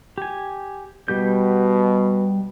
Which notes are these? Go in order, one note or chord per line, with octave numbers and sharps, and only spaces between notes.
G4 G#5
B2 G3 G4 G6